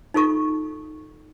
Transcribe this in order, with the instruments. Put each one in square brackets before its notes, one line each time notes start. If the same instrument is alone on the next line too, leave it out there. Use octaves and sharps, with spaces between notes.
[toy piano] D#4 F4 A4 C#6